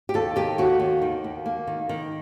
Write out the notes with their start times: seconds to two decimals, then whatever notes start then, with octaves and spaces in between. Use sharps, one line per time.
0.09 G4
0.14 D#2 A4
0.36 D#3 G4
0.58 D#2 F#4
0.80 D#2
1.02 D#3
1.24 D#2
1.46 A#3
1.67 D#3
1.89 D#3